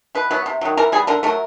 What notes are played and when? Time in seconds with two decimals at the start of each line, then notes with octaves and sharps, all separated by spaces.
0.15 B2 B4
0.31 F#3 B3
0.46 C3
0.61 D#3 F#3
0.77 E3 A#4
0.92 G3 B3 G#4
1.07 D3 A#4
1.23 F#3 A3 A#4